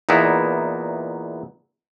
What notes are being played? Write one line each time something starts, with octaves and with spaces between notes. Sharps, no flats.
E2 A#2 B3 D#4 E4